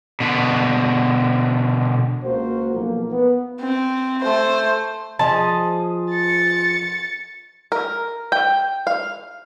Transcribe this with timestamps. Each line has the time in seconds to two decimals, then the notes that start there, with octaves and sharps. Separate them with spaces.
0.20 B2 D3
2.24 C#2 A#3 F#4 A#4 C5
2.73 B1 F3 A#3
3.12 B3
3.61 C4
4.21 A3 C5
5.19 F3 G#4 D#5 A5
6.10 A6 C#7
7.72 A#4
8.32 G5
8.87 F5